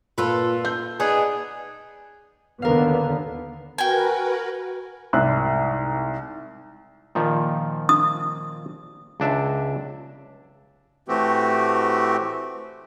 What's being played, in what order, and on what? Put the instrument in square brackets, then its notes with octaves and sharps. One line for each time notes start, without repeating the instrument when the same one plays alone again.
[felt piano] A#2 [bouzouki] F4 A4 B4
[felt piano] G6
[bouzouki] B3 D4 D#4 [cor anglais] G#4
[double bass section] D#2 D3 B3 [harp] A#4 F5
[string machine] F#4 A#4 B4 [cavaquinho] G5 G#5
[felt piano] C2 G#2 F#6
[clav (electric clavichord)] A#2 D#3 F3
[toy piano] D#6
[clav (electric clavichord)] C#2 D4 E5
[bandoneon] A2 E3 A3 C4 F#4 G4